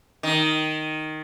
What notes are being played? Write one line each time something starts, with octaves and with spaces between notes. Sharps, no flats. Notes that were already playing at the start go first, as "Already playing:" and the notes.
D#3